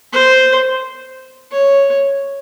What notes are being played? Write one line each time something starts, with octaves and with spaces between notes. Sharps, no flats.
C5
C#5